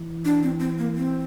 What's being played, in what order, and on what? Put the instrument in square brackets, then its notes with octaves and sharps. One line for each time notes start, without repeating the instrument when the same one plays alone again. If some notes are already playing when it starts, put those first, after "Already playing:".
Already playing: [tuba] E3
[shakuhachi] D4
C4
C4
A#3
C4